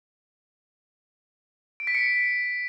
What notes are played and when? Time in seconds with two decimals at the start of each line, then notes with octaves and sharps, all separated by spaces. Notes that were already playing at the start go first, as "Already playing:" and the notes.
1.80 D7
1.87 B6
1.95 C#7